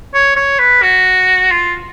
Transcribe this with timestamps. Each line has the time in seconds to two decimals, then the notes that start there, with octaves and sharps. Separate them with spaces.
0.14 C#5
0.36 C#5
0.59 B4
0.82 F#4
1.51 F4